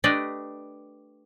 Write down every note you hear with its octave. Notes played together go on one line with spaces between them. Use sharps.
A3 D4 G4 B4 D5 D#5